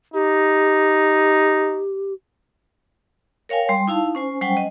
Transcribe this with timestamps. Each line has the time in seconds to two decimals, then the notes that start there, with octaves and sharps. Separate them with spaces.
0.14 D#4 G4
3.49 A#4 C#5 F5 G5 G#5
3.69 G3 C6
3.88 D#4 E4 F5 A5
4.15 C#4 C5 G#5
4.41 F#3 G3 C#4 C5 G5 G#5
4.57 D#5